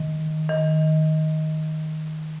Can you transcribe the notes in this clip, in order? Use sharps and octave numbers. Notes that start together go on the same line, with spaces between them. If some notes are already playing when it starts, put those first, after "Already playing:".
Already playing: D#3
D#3